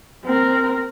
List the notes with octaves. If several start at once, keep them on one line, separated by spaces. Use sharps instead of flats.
C4 A#4